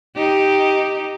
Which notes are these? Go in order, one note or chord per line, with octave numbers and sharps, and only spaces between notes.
D#4 G4